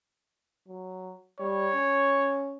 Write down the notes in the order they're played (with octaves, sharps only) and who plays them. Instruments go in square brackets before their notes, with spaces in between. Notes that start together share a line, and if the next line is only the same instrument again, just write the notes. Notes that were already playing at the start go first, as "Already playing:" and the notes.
[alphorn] F#3
[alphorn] G3 [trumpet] C#5
[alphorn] C#4